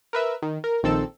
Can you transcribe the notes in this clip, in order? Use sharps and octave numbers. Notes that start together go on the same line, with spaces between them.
A#4 B4 E5
D#3
A#4
A#1 D#3 C4 A4 E6